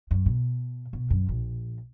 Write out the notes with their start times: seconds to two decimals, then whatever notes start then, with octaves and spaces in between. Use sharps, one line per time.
0.11 F#2
0.26 B2
0.93 B2
1.10 F#2
1.29 A#1